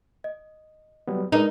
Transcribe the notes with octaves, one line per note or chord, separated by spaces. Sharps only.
D#5
F#3 G3 B3
G#3 D4 D#4 A#4 B4